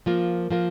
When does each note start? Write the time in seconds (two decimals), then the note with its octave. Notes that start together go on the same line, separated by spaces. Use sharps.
0.06 F3 A#3 F4 A#4
0.50 F3 A#3 F4 A#4